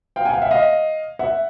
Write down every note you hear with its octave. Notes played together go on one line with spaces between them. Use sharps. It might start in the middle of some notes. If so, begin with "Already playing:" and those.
F5 G5
F#5 G#5
F5 G5
E5 F#5
D#5 F5
E5 F#5